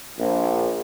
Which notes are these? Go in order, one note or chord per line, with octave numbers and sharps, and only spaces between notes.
A#1